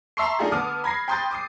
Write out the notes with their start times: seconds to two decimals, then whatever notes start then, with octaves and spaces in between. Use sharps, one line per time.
0.17 E5 A5 A#5 C6 C#6 C7
0.39 A3 D4 D#4 F4 G4 G#4
0.52 D3 B3 A5 D6 D#6 F6
0.84 B5 G#6 A#6 C7
1.08 G5 B5 C6 D#6 G6 A6
1.31 D6 D#6 C7